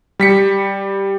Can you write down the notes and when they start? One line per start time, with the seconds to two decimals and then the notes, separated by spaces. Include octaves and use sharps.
0.20 G3 B6 C#7